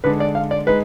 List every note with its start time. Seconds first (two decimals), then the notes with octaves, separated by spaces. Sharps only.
0.04 D3 G#3 D4 B4
0.20 D5
0.35 F5
0.51 D5
0.67 G#3 D#4 B4